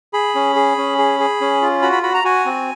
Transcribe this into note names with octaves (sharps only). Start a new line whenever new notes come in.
G#4 B5
C#4
G#4
C#4
G#4
G#4
C#4
F4
F#4 B5
B5
F#4 B5
A#5
F#4 G#5
C4